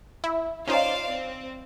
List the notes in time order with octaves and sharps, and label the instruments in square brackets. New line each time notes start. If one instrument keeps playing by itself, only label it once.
[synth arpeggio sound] E4
[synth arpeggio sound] C#4 D#4 F4 [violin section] C5 D5 F5
[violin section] C4